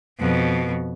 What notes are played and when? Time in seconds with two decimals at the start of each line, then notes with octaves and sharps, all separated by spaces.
0.20 F2 B2